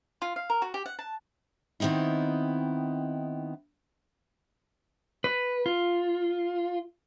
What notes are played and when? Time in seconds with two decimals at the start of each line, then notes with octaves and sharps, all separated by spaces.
0.22 F4
0.36 F5
0.50 A#4
0.62 F#4
0.74 G4
0.86 F#5
0.99 A5
1.80 D#3 B3 C4 D#4 E4
5.24 B4
5.66 F4